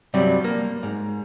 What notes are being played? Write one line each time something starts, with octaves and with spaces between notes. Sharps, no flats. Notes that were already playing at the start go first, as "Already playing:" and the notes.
G2 C3 F#3 G3
A#3
G#2